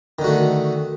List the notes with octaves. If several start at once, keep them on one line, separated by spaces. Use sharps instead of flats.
D3 D#3 A3 F#4